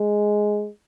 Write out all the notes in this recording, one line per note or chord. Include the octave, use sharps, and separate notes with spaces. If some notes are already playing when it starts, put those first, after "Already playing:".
Already playing: G#3